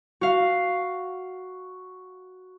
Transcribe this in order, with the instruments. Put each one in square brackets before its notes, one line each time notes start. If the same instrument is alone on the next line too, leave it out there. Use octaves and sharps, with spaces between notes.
[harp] F#4 F5